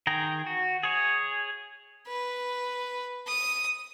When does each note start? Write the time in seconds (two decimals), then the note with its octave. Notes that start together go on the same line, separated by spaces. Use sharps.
0.07 D#3 G#4 G5 A#5
0.46 F#4
0.83 G#4 C#5
2.08 B4
3.27 D#6